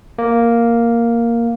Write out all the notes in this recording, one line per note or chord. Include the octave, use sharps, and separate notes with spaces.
A#3